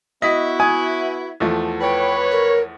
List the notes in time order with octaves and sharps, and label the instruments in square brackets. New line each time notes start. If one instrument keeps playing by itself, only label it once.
[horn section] B3 E4 F#4 [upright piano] D#5 B6
[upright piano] G#5 D#6 G#6
E2 F3 A3
[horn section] B4 C#5 [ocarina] G5
[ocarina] A#4